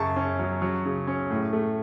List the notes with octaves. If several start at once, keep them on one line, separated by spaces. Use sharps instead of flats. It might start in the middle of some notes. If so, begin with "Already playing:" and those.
Already playing: F#2 C#3 A5 C#6
C#4
F#3
F#3
C#3
C#4
A2
A3